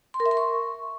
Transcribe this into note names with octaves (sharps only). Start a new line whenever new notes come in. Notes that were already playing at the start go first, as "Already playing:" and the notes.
C6
A#4
E5
C6
C#6